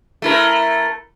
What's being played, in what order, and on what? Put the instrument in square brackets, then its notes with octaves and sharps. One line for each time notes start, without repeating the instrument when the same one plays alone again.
[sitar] A3 E4 A#4